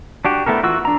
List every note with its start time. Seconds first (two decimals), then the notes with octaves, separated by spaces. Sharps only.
0.25 D4 F#4 G4
0.46 A3 B3 E4 A4 A#4
0.63 E3 F4 F#4 E6
0.85 D4 A#5